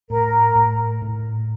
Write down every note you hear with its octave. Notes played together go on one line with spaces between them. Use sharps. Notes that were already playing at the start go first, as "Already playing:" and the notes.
A2 A#4
A2
A2